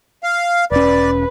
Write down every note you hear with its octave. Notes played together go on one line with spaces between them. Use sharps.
F5
E1 C#4 B4 D5